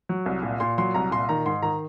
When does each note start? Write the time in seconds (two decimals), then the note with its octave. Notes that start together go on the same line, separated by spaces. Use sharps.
0.09 F#3
0.26 C2
0.43 A#2
0.60 A#2 C6
0.78 F#3 C6
0.94 C2 A#5
1.11 A#2 C6
1.29 D#3 A#5
1.46 G#2 C6
1.62 D#3 A#5